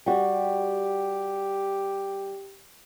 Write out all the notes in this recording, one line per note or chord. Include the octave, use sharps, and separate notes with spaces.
G3 F#4 G4